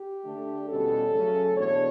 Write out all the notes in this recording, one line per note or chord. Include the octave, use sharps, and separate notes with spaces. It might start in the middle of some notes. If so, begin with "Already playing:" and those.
Already playing: G4
D3 A3 D4
E2 B2 G3 C#4 A4
C#3 F#3 A3 C#4
E2 B2 A3 D4 C#5